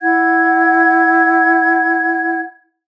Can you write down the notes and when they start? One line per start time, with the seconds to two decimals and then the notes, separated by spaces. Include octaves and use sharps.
0.02 E4 F#5 G#6